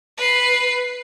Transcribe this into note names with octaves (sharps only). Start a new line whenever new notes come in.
B4 C7